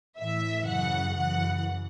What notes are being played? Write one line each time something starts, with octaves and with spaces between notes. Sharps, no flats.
A2 E3 E5
F#2 C#3 E3 F#5
F#2 C#3 E3 F#5